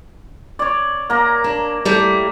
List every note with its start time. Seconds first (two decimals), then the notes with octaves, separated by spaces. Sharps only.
0.59 C#5 D5
1.10 A#3 A#5
1.44 D4
1.85 G3 A3 E4